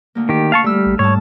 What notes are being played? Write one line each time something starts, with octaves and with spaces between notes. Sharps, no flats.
D2 A#3
D#3 G4
F5 A5 C#6
G3 A3 E6 F6
A1
G#2 G3 C#5 A5